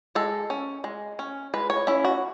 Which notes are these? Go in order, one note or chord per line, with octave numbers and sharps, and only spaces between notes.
G#3 A4
C#4
G#3
C#4
G#3 B4
C#5
C#4 E4
F#4